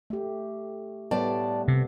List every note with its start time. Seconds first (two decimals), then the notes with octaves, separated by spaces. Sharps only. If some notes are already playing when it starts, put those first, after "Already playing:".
0.10 A3 G4
1.11 A2 G3 A3 B3 D5 A5
1.68 C3